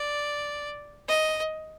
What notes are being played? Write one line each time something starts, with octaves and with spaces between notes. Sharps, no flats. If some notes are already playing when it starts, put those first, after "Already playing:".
Already playing: D5
D#5